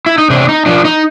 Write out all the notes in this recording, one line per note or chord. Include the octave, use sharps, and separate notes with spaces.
E4
D#4
C3 D4
D#4
F3 D4
D#4